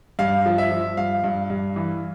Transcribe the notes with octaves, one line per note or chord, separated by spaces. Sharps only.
G2 F5
F3
E5
F3
G2 F5
G2
G2
E3